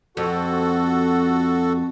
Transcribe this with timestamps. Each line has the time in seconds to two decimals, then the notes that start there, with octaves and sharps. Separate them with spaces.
0.17 F2 F#4 A4